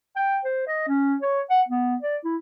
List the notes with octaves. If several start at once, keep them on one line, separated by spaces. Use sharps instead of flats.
G5
C5
D#5
C#4
C#5
F#5
B3
D5
E4